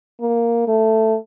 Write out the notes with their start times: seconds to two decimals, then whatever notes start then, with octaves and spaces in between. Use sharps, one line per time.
0.21 A#3
0.68 A3